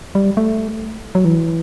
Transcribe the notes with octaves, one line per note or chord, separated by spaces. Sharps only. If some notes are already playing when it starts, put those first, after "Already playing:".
G3
A3
F#3
E3